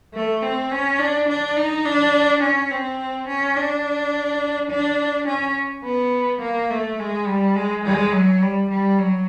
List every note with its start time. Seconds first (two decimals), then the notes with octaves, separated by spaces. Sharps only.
0.14 A3
0.43 C4
0.72 C#4
1.00 D4
1.29 D4
1.57 D#4
1.86 D4
2.43 C#4
2.71 C4
3.28 C#4
3.56 D4
4.71 D4
5.28 C#4
5.85 B3
6.42 A#3
6.71 A3
6.99 G#3
7.27 G3
7.56 G#3
7.85 G#3
8.13 F#3
8.42 G3
8.70 G3
8.98 F#3